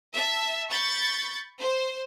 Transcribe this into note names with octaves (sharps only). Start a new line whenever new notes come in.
E5 A5
B5 C#6 G6 A6
C5